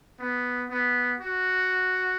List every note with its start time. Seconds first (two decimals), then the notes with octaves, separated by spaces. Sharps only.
0.19 B3
0.69 B3
1.20 F#4